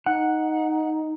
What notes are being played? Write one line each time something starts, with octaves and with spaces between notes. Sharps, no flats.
D#4 F#5